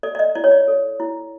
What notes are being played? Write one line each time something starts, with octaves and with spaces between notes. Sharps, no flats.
A4 D5
D5
D#5
E4 D5
C#5
D5
A4
E4